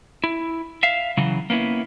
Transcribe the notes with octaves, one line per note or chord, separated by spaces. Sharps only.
E4
E5 F5
C#3 E3 F#3
A#3 B3 C#4 E4